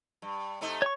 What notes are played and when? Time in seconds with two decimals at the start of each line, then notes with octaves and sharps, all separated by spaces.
0.22 G2
0.61 C3 A3 D#4
0.82 C#5 C#6